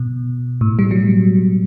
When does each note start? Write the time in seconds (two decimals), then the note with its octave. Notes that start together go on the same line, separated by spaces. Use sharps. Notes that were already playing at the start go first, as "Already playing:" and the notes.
Already playing: B2
0.61 A2
0.79 G3
0.91 F#3